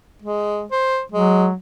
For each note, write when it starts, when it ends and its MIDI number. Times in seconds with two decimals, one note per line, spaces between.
0.22 0.65 56
0.72 1.02 72
1.12 1.54 54
1.12 1.48 56